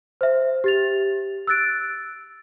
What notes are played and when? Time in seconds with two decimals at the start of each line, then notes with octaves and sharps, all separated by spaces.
0.21 C5 E5
0.64 G4 A6 F7
1.47 E6 F#6 A6 D7